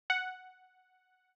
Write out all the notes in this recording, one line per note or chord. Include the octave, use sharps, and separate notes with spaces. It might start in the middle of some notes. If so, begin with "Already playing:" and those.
F#5